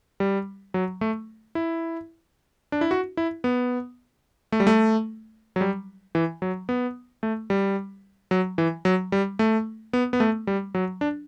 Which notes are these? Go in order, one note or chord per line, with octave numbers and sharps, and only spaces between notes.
G3
F#3
A3
E4
D4
E4
F#4
E4
B3
A3
G3
A3
F#3
G3
E3
F#3
B3
A3
G3
F#3
E3
F#3
G3
A3
B3
B3
A3
G3
F#3
D4